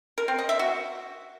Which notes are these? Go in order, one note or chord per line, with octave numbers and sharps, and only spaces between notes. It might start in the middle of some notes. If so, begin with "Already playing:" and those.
A#4
C4
D#5
E5
F#4